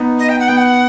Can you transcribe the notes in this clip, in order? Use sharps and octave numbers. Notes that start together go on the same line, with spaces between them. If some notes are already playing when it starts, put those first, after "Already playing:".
Already playing: B3 D#4
D#5
G5
F#5
B3 G5
F#5